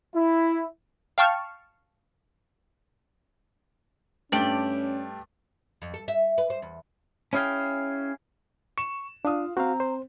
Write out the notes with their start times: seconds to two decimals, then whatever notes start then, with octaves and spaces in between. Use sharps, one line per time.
0.15 E4
1.18 F5 G5 A5 C#6 F6
4.32 G2 A3 C#4 G4 D5
5.82 F2
5.94 A4
6.08 E5
6.38 B4
6.50 C5
6.62 E2
7.33 C#4 E4 G#4 F5 G5
8.78 C#6 E7
9.25 D4 F4 F5 D#6
9.57 C4 F#4 F5 A#5
9.80 C5